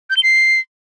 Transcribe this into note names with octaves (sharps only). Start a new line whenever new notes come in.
G6
G7
C7